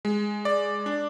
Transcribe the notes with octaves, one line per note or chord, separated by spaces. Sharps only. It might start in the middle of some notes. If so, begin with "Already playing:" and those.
G#3
D5
D4